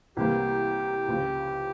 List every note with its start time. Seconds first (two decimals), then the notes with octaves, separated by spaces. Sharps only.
0.17 C2 C3 E3 G3 A#3 G4
1.08 C#2 C#3 F3